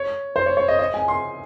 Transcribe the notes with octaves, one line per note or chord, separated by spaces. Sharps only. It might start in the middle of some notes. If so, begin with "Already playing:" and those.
Already playing: C#5
C5
C#5
C#5
D#5
D#5
G#5
C6